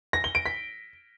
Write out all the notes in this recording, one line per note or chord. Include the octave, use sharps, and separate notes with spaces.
A#6
G7
D7
B6